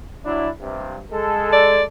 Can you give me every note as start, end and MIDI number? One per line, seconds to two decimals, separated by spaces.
0.24 0.47 54
0.24 0.47 62
0.24 0.47 64
0.59 0.99 43
0.59 0.99 48
1.12 1.82 56
1.12 1.82 69
1.53 1.83 74